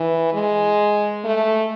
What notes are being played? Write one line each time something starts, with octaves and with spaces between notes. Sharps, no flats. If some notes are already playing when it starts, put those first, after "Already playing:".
Already playing: E3
G#3
A3